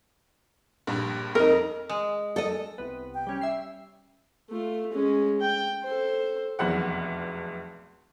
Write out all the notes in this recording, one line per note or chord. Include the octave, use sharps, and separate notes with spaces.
A#1 G2
F2 D#4 A#4
G#3
A4 D#5
C2 B3
G5
G3 C#4
E5 C7
A3 F4
G#3 C#4
G5
A4 C5
F1 B1 E2 F#5